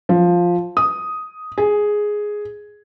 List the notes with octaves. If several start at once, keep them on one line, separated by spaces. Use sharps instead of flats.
F3
D#6
G#4